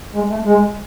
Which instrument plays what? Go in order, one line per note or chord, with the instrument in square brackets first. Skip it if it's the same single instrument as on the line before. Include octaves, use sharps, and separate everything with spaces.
[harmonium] G#3
A3
G#3